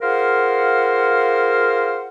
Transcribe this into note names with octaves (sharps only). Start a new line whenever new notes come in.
F4 G#4 A#4 C5 F5 F#5